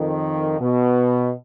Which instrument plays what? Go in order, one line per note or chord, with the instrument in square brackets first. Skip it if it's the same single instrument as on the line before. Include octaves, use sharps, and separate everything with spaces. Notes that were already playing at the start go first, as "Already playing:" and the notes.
Already playing: [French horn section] F2 D#3
B2